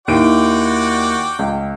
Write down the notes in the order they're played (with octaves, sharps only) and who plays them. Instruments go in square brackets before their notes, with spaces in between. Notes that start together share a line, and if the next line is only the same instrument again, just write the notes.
[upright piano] D#2 E4 D7 [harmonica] F#4 D5 G5
[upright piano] C#2